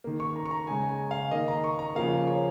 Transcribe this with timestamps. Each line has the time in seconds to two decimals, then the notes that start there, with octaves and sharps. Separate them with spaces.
0.04 D#3 A#3
0.20 C#6
0.36 A#5
0.46 C#6
0.51 A#5
0.67 C#3 G#3 G#5
0.89 G#5
1.11 F5
1.31 D#3 A#3 D#5
1.48 A#5
1.64 C#6
1.79 A#5
1.95 C#3 F3 A#3 F5
2.27 C#5